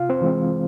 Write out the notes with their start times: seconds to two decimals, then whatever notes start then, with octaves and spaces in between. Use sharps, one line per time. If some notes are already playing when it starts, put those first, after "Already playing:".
Already playing: C3 F4 F5
0.10 C4 C5
0.21 E3 G#3 C4